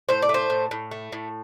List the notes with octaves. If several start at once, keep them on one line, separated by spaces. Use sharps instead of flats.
A2 C5
D5
A3
C5
A2
A2
A3
A2